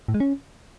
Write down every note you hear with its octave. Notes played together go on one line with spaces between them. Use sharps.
A2
G#3
C#4